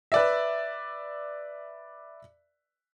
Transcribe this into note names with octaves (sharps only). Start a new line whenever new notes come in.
B4 D5 E5